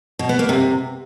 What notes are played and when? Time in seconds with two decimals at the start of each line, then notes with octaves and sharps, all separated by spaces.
0.19 B2
0.29 B3
0.39 A#3
0.49 C3